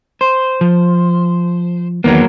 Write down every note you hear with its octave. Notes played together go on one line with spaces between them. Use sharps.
C5
F3
E2 D#3 F#3 A#3 B3